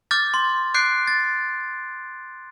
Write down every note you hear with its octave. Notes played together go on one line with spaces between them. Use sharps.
D6 F6 G6 A6
C6
D6 F#6 G6 C7 D7
A6